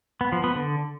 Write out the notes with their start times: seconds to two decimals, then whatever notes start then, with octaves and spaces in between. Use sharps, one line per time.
0.21 B3
0.32 F3
0.44 B3
0.55 D3